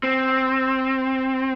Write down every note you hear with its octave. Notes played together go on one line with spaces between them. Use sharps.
C4